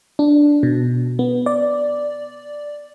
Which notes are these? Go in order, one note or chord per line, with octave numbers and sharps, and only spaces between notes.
D4
B2
B3
D5